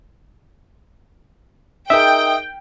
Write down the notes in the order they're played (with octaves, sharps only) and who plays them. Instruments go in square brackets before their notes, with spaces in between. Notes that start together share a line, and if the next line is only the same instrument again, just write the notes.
[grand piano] D#4 G#4 A#4 [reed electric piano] E5 [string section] G5 [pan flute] D#6